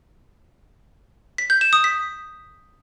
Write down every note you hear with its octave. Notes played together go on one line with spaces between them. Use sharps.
B6
G6
E7
D#6
B6